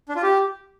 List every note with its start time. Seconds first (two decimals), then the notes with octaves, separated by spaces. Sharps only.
0.09 D4
0.16 F4
0.23 G4